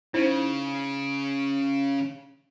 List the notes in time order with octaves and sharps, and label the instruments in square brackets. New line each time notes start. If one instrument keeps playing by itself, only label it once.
[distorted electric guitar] C#3 [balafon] D#4 E4 C5